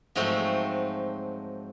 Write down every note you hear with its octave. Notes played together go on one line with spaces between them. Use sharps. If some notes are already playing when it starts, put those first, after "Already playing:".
G#2 F3 F#3 A3 C4